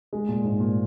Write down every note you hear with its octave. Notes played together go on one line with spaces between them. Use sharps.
G#3
A#2
G#2
A#2